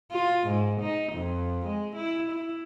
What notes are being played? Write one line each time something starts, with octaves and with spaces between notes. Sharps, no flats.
F4
G#2
D#4
F2
G#3
E4
E4